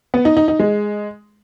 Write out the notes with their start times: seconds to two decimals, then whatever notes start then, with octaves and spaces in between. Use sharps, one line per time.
0.14 B3
0.25 D#4
0.37 D#4
0.48 D#4
0.59 G#3